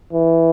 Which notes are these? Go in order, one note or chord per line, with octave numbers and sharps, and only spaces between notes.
E3